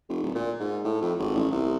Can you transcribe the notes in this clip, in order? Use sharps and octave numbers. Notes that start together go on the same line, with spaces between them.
F1
D1
A#2
G#2
A2
F2
G#1
A1
C2